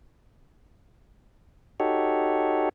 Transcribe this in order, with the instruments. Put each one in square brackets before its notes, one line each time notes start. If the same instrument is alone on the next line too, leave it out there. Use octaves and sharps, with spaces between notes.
[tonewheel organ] D#4 F#4 G4 A4 C#5